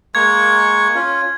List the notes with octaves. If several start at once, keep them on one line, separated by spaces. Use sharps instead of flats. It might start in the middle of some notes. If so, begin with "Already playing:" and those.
G#3 A#3 C#6 G#6
C#4 F4